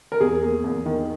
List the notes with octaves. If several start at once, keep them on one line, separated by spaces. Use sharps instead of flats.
A#4
E2 G#4
A#3
E2
D#3